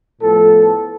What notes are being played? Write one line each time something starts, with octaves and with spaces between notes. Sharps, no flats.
A2 F3 B3 A4